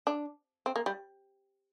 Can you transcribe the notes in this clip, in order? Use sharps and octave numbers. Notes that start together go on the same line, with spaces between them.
D4
C4
A#3
G3